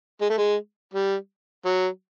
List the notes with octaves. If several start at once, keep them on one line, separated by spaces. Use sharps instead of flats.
G#3
A3
G#3
G3
F#3